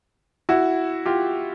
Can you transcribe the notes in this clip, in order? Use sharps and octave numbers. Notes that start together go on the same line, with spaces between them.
E4 F#4
F4 G4